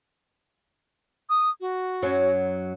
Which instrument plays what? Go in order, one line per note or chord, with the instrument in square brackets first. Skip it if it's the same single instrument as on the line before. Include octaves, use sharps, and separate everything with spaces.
[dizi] D#6
F#4
[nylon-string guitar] F#2 F#3